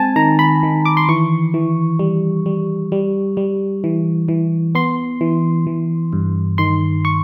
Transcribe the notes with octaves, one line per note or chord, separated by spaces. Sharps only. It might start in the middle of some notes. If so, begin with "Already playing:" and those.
Already playing: G#3 C4 G#5 A5
D#3 A#5
B5
D#3
D6
C6
E3 C#6
E3
G3
G3
G3
G3
E3
E3
B3 C6
E3
E3
G2
D#3 C6
C#6